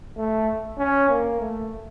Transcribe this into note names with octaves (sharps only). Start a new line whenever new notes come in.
A3
C#4
A#3
A3